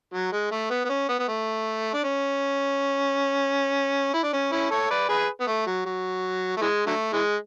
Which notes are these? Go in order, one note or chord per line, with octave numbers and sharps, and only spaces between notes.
F#3
G#3
A3
B3
B3
C#4
B3
B3
A3
D4
C#4
E4
D4
C#4
C#4 E4
A4 C#5
B4 D5
G#4 B4
B3
A3
F#3
F#3
A3
E3 G#3
D3 F#3 A3
E3 G#3